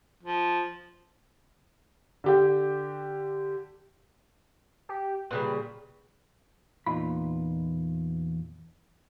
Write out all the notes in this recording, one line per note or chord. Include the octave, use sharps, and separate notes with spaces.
F3
D3 G4 G5
G4
A#2 C#3 G3 B4
E2 A#2 E3 D#4 F4 B5